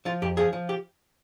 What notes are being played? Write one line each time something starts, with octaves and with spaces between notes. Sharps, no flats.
F3 F4
F2 G4
F3 G#4
F3
G4